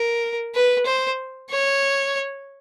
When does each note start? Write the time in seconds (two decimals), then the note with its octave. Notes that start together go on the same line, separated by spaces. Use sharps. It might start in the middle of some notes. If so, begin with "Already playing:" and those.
Already playing: A#4
0.55 B4
0.86 C5
1.50 C#5